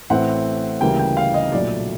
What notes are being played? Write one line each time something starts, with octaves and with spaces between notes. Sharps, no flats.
A1 A2 E3 A3 C4 F#5
D2 C#3 E3 G3 A#3 G5
G5
F5
D#5
B1 A#2 F#3 A3 D5